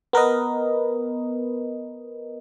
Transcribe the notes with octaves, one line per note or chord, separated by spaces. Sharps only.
B3 A#4 B4 D#5